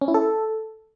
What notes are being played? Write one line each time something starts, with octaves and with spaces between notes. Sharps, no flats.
C#4
E4
A4